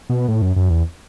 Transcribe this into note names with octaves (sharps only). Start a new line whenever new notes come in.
B2
A2
F#2
F#2
E2